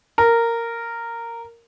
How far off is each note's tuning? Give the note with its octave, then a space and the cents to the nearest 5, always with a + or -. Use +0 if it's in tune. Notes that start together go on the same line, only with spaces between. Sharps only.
A#4 -10